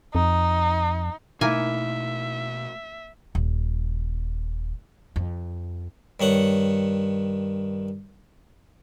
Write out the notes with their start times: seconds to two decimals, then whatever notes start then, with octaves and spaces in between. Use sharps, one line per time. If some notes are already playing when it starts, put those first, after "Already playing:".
0.15 F2 D#4
1.41 B2 A3 A#3 D#4 E4 E5 G#5
3.35 D#1
5.16 F2
6.20 G2 D#3 C#5 F#5